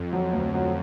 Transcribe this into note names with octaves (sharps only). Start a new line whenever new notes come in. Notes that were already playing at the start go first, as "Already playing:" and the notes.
Already playing: F2
F#3
D2
F#3